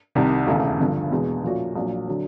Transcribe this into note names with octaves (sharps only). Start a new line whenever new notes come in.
C2 C3 D#3
E1 D#2 C#3 E3 A3
G1 G2 D3 F3
E2 B2 G#3 B3
A#2 F3 A3 C#4 F#4
A#1 A#2 F#3
D3 F#3